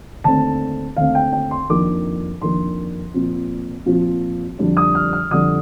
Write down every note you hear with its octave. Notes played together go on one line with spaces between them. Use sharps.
D#2 D3 A3 C4 A5
D#2 D3 A3 C4 F5
G5
G5
C6
F2 D#3 A#3 D4 D6
F2 D#3 A#3 D4 C6
A#2 F3 C4
A#2 F3 C4
F2 D3 G3 D4
D#6
F6
F6
F2 D3 G3 D4 D#6